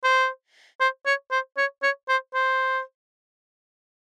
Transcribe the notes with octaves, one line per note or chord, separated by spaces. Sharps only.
C5
C5
C#5
C5
C#5
C#5
C5
C5